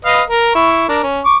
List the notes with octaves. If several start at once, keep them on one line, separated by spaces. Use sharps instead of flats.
B4 D#5 F5
A#4
E4 C#6
D4 A#4
C#4
C#6 D6